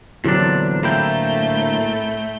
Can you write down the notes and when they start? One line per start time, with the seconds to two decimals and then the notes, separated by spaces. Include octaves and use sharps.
0.24 E2 A#2 D3 F#3 C4 D4
0.83 A2 A3 A#3 E4 G5 G6